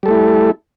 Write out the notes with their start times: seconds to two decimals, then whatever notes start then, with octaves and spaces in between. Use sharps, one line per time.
0.03 G3
0.06 A4
0.08 A3
0.11 E4